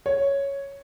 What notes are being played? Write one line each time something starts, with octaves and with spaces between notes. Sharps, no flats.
C#5